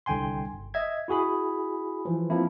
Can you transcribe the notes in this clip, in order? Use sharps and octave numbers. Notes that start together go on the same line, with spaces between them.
C2 D3 G5 G#5 C6
G1
D#5 E5 G#6
E4 F#4 G#4 B5
E3 F3
F3 A#3 C4 E4